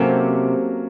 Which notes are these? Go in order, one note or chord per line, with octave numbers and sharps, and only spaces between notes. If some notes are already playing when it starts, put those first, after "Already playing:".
Already playing: C3 F#3 A#3 C#4 F#4 A4